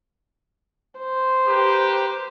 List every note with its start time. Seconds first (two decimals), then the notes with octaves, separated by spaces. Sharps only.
0.99 C5
1.47 G4 A#4 B4